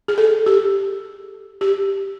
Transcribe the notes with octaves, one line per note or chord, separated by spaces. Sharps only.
G#4
A4
G4
G4